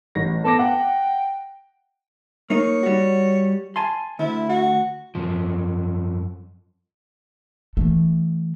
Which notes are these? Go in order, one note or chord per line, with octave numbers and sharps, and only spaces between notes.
A1 A#6
B3 A4 D6 A#6
F#5 G5
A#3 D#4 C#5
G3 F#4
G#5 A5 C6
D2 E4
F#4
F#2 F3
E3 A3